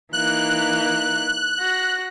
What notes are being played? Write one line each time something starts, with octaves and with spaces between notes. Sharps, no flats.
E3 A#3 D#4 F#6
F#4 A#6